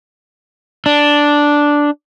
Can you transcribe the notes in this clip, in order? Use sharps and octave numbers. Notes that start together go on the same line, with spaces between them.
D4